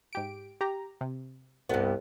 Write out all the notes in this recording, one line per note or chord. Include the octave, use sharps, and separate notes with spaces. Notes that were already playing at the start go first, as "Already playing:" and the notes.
G#2 G4 D7
G4 A#5
C3
C2 G2 B3